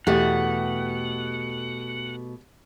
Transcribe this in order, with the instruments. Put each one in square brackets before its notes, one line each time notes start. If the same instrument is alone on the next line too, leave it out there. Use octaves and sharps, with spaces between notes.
[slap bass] E2 [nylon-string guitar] B2 A3 [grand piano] G4 [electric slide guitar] F#5